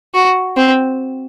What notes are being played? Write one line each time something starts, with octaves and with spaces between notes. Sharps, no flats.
F#4
C4